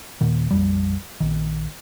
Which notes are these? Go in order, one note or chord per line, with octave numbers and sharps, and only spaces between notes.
D#1 A#2 D#3
A#1 F2 G3
A#1 D#3